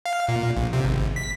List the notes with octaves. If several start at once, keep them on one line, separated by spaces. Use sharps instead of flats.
F5
A#2
A#1
C3
G#1
B6